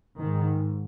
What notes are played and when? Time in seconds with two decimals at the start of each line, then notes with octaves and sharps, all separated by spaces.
0.18 G#2 D#3